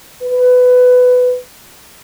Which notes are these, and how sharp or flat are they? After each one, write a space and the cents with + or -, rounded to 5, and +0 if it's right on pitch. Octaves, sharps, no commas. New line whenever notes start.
B4 +15